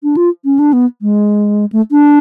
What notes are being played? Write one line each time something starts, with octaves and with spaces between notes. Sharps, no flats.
D4
F4
C#4
D4
B3
G#3
A3
D4